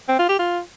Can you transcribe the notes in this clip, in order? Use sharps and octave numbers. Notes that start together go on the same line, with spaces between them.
C4
F4
G4
F4